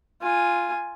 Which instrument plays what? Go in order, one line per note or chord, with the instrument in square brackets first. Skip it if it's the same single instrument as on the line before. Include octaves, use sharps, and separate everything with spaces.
[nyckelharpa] F4 G#5